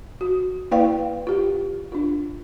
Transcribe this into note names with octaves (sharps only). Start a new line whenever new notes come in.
F#4
A#3 E4 B4 D5 F5 G5
F4 G4
D4 F4